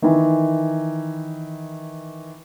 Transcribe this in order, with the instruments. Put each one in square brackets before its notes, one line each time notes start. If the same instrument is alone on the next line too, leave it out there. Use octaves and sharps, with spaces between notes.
[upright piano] D#3 E3